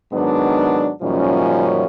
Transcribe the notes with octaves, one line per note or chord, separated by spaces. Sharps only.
G#2 D#3 F#3 B3 D4
F#2 A#2 D#3 F3 G3 C#4